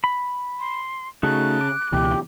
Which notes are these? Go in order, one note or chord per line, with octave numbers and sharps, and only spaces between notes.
B5
C6
C#3 A3 D#4 F#4 A5 F#6
D6
C#2 B2 E3 G4